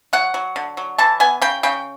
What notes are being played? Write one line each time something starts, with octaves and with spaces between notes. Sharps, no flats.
F#3 F#5
F#3
D3
F#3
E3 A5
B3 G#5
C#3 G5
C#3 G5